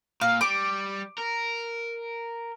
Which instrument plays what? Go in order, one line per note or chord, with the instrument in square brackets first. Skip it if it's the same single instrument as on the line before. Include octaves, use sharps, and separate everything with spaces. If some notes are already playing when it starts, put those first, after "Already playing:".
[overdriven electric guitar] A#2 [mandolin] F5
[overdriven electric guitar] G3 [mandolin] D6
[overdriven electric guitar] A#4